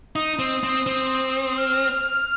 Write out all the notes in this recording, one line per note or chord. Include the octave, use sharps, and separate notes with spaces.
D#4 D#6
C4
C4
C4
F6